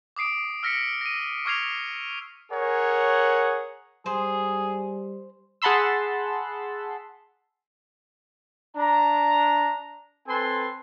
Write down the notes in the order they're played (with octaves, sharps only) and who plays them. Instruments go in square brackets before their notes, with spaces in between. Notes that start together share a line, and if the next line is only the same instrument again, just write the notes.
[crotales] D6 D#6 C7 D7
E6 F6 A#6 B6 C#7
A#6 D#7
C#6 D6 F6 G#6 C7 F7
[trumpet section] G#4 A#4 C#5 F#5
[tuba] G3 [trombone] G#4 [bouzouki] C5
[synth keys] G#4 F#5 A5 B5 C6 E6
[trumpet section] D4 A#5
C4 A4 B4 G#5 C6